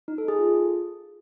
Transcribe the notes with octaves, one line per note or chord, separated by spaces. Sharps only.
D#4
A4
G#4
F4